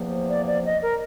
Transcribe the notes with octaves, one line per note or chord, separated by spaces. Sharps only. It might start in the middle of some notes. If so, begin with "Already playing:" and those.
Already playing: E2 C3 F3 A#3
D5
D5
D#5
A#4